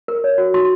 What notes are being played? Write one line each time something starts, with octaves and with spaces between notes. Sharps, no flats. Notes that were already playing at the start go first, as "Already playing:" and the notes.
A#4
C#5
F#4
F#4 C6